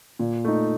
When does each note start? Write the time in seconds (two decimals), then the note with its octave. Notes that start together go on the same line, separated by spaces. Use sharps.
0.19 A#2
0.44 A3 D#4